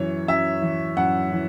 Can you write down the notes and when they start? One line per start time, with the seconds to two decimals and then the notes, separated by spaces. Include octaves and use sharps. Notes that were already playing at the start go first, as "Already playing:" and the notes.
Already playing: F#2 E3 C#5
0.28 F#2 E5
0.62 E3
0.97 F#2 F#5
1.32 E3